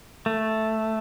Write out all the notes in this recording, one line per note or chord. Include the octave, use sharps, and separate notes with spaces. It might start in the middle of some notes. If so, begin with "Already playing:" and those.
A3